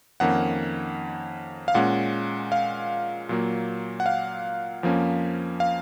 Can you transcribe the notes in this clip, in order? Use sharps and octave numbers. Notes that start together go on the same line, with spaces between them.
F2 D#3 A#3 C#4 F#5
F5
A#2 G#3 C#4 F#5
F5
A#2 F#3 A#3
F#5
F5
F2 F3 A#3 C#4
F5